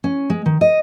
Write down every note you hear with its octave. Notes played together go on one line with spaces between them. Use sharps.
C#4
G#3
D#3
D#5